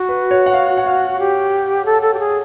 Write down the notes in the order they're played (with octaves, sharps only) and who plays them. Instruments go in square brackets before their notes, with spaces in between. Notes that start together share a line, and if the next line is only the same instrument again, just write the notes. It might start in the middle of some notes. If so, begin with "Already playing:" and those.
Already playing: [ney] F#4
[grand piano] B4
C#5
F#5
F5
F#5
F5
[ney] G4
A4
A4
G4
G#4